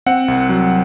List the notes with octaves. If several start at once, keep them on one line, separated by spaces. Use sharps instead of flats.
C4 F#5
C2
F#3